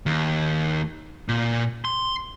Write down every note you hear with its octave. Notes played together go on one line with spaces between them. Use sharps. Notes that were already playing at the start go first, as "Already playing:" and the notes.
D#2
A#2
C6